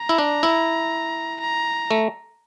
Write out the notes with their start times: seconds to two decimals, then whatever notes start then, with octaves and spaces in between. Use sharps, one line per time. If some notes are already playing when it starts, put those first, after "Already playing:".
Already playing: A#5
0.09 E4
0.18 D4
0.43 E4
1.41 A#5
1.91 A3